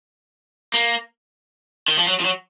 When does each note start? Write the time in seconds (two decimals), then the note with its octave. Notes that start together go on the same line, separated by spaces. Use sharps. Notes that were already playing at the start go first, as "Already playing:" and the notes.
0.74 A#3
1.88 D#3
1.98 F3
2.08 F#3
2.20 F3
2.25 F#3